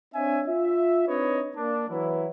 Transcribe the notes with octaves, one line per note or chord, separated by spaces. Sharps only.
C4 D4 C#5 D#5 E5 G#5
F4 E5
C4 D4 D#4 B4 C#5 D#5
A#3 D4
E3 F#3 E4